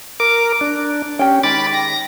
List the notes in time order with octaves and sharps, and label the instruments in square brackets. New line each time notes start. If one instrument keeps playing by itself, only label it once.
[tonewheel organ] A#4 D6
D4
[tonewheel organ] C#4 [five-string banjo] G4 G5
[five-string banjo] D#3 G#3 [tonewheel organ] B5 D6 A6
[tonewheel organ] A#6